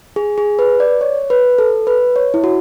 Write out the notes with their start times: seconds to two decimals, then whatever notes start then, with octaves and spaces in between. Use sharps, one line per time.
0.16 G#4
0.38 G#4
0.59 B4
0.80 D5
1.01 C#5
1.30 B4
1.58 A4
1.87 B4
2.16 C#5
2.34 E4
2.44 F#4